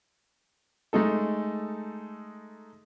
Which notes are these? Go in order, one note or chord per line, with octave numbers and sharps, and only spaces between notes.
G#3 A3 D#4 A4